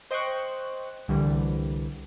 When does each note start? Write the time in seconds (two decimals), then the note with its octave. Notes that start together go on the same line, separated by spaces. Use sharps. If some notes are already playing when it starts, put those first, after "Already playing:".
0.11 C5 D#5 G5 C6 C#6 F#6
1.08 C2 D3 E3 G3